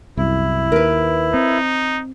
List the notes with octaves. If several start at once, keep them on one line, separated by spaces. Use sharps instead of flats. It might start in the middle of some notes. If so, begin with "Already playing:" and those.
C2 F#2 E4
D#2 A#4 B4
C4 D#4